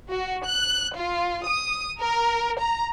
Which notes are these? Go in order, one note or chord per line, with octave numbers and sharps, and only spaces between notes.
F#4
F#6
F4
D#6
A#4
A#5